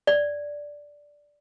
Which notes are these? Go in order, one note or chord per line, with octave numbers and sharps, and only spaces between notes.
D5